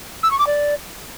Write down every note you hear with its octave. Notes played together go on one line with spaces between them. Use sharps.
E6
C#6
D6
D5